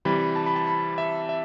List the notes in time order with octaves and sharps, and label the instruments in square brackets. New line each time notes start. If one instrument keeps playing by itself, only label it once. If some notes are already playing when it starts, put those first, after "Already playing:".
[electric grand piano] C3 E3 G3 B5
A5
B5
A5
B5
E5
E5